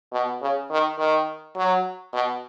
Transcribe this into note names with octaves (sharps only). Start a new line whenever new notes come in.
B2
C#3
D#3
D#3
F#3
B2